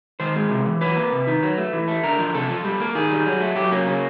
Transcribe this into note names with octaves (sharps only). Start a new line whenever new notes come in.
D#3 C5
G#3
C3
E3
F#3 B4
A#3
C3
D#3
F#3
A3
E3
A3
D3 A#4
F3
C3 A4
F3
G3
A#3
D#3 G#4
G3
F#3
A3
F#3 G4
A#3 C#4
C#3 C#4